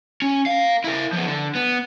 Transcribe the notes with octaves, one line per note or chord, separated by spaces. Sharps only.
C#4
A#4 F5
E4 A#4
F3 B3
D3
B3